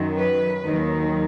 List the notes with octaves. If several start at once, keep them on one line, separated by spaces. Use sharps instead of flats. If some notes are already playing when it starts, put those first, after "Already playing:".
Already playing: F#2 D#3 F#3
B4
D#2 D#3 F#3